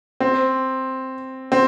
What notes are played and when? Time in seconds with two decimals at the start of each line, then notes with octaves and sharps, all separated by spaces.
0.20 C4
1.52 C4